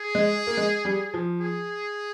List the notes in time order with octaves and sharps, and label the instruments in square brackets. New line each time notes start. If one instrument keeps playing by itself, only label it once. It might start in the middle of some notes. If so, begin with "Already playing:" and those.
Already playing: [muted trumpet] G#4
[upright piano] G#3
A#3
G#3
G3
F3
[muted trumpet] G#4